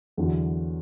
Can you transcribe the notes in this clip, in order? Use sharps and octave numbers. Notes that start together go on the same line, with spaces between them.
E2 D3 F#3